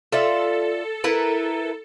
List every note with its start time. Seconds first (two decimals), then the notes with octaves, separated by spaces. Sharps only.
0.12 F4 A4 D5 E5
1.04 E4 A#4 B4